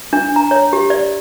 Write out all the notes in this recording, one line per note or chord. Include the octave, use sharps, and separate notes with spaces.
D4
A#5
C#5
G4
D5